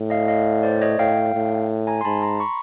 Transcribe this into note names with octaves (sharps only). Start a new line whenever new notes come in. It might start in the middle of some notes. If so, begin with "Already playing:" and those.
Already playing: A2
D#5 F5
D#5 F5
C5 D5
C#5 D#5
A2 F5 G5
A2
G#5 A#5
C6
G#2 A5 B5
A#5 C6
B5 C#6